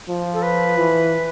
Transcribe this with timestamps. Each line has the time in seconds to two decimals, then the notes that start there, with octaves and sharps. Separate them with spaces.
0.08 F3
0.34 A4
0.43 B4
0.78 E3